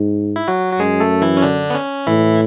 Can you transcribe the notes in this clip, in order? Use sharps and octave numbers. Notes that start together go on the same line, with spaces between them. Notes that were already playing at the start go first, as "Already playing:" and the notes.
Already playing: G#2
E4
F#3 F#4
F#4
F#2 G#3 G#4
A3 A4
E3 E4
C#4
D3 D4
B3
C#4
A2 E3 E4